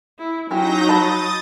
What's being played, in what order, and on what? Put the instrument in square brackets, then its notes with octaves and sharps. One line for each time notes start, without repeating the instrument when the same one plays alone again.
[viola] E4
[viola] F#3 [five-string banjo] C#4 E4 G4 [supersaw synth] D#4 G6 A#6
[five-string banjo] A5 B5 [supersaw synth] D#6 A6